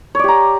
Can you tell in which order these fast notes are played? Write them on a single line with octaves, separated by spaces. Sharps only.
C#5 D5 G4 A#5